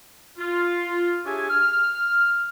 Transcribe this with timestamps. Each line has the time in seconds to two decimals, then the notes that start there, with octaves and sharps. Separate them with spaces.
0.38 F4
1.25 D4 G4 G#4 C#5 E5 G#5
1.50 F6